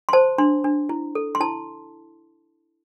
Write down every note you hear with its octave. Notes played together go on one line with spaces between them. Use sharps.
C6
C5 A5
D4 C6
D4
E4
A4
C6
E4 A5